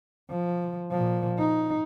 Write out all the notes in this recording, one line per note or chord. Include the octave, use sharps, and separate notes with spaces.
F3
A#2 F3
D#4